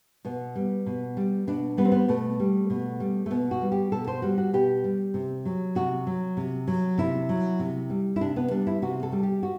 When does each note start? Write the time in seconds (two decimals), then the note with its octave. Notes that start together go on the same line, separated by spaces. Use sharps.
0.25 B2 B3
0.56 G3
0.86 B2
1.17 G3
1.47 B2 D4
1.77 G3 B3
1.85 C4
1.92 B3
2.08 B2 A3
2.40 G3
2.70 B2
3.00 G3
3.26 A3
3.30 B2 B3
3.51 F#4
3.62 G3
3.72 G4
3.92 B2 A4
4.07 C5
4.22 G3 F#4
4.38 F#4
4.53 B2 G4
4.84 G3
5.14 C3
5.45 F#3
5.75 C3 F#4
6.07 F#3
6.37 C3
6.67 F#3
6.98 C3 E4
7.29 F#3
7.60 C3
7.90 G3
8.16 E4
8.21 C3 D4
8.36 B3
8.51 G3 D4
8.67 E4
8.82 C3 F#4
9.03 A4
9.12 G3
9.23 G4
9.43 F#4